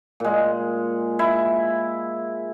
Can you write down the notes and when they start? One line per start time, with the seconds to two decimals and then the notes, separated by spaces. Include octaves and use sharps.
0.20 A#2 G#3
1.19 E4